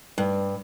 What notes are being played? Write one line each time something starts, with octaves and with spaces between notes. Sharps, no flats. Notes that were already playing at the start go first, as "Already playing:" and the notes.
G2